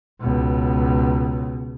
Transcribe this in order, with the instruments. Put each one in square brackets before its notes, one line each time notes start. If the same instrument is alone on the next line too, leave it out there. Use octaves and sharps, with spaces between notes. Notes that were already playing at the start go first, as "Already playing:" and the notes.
[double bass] C#2 B2